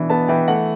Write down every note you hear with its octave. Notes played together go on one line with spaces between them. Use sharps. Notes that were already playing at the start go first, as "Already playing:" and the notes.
Already playing: B2 E3 D4
B3 A5
E3 G5
A3 F#5